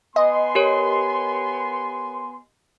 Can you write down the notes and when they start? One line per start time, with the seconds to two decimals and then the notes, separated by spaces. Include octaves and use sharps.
0.16 B3 D#5 G#5 C6
0.55 G4 A#4 C#5